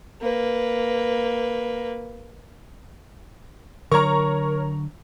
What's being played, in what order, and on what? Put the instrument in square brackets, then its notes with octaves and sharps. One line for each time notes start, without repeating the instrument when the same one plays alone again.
[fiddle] A#3 B4
[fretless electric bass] D3 F#3 [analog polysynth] A#4 C#5 [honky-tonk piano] A#5 C#6